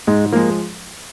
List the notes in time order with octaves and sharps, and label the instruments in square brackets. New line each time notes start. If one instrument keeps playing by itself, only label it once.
[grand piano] G#2 [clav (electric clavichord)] G#3
[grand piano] F3 G#3 [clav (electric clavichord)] A#3